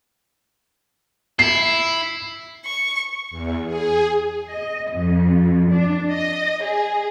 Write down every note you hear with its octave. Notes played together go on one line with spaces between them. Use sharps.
E4 C7
C#6
E2
G#4
D#5
F2
D4
D#5
G#4